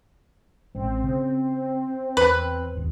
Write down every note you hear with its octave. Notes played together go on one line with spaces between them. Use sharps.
A1 G#3 C4
C#3
E2 B4
G1 D#2